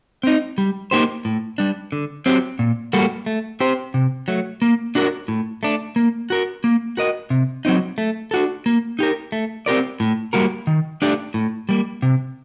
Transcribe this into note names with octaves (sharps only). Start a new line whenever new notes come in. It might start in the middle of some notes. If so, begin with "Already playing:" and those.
C4 D#4
G3
A#3 D#4 G4 C5
A2
G3 D4
D3
F#3 C4 G4
A#2
G3 A#3 F#4 A4
A3
C4 G4 C5
C3
F#3 A3
A#3
D4 F#4 A#4
A2
A3 D4
A#3
F#4 A#4
A#3
F#4 A#4 D#5
C3
F#3 C4 D#4
A3
D4 F#4 A4
A#3
D#4 G4 A#4
A3
C4 G4 A#4 D5
A2
G3 A#3 F#4 A#4
D#3
A3 D4 G4 D5
A2
G3 A#3
C3